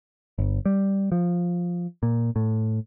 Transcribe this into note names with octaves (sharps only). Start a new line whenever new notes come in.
G1
G3
F3
A#2
A2